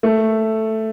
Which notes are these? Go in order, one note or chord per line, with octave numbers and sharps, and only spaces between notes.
A3